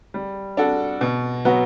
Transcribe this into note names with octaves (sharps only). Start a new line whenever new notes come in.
G3
D4 F#4 A4
B2
F#3 B3 F#4